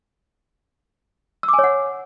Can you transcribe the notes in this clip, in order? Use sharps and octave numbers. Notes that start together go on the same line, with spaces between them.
E6
D6
G#5
C#5
F#5